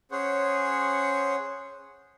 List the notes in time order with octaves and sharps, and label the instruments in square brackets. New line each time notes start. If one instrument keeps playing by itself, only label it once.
[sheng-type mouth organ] C#4 G#4 C5 C#5 F#5